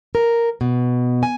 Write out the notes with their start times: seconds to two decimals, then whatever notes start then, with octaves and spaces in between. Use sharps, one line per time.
0.15 A#4
0.61 B2
1.23 G#5